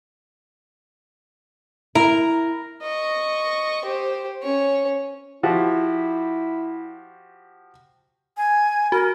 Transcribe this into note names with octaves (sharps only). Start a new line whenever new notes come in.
E4 A#4
D#5 C#6
G4 C5
C#4 C#5
F3 E4 F#4 G4
G#5
F#4 A#4